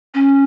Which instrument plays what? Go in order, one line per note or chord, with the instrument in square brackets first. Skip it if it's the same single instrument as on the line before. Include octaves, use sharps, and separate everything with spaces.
[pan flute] C#4